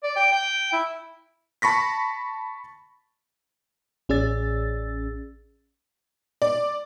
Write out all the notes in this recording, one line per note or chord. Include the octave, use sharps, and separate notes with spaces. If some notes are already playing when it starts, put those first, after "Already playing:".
D5
G5
G5
E4
A5 B5 C#6 A#6 B6
A1 C#4 G#4 D5 E6 A6
D5